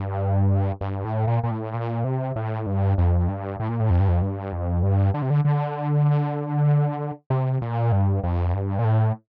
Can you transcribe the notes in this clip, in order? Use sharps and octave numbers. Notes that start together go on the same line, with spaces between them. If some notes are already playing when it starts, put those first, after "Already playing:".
Already playing: G2
G2
A2
A#2
A#2
A2
A#2
C3
A2
G2
F2
G2
A2
A#2
A2
F2
G2
F2
G2
F2
G2
D3
C3
D3
D3
C3
A#2
G2
F2
G2
A#2
A2